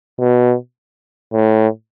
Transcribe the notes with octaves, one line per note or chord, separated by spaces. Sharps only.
B2
A2